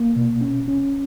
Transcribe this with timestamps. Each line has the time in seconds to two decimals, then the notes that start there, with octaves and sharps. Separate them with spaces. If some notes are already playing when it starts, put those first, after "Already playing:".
Already playing: A#3
0.16 B2
0.41 C#4
0.68 C#4